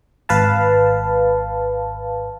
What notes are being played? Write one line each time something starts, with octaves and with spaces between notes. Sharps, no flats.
G#1 B4 F5 A5